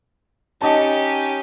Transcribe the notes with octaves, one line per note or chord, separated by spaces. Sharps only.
C#4 D#4 G4 A5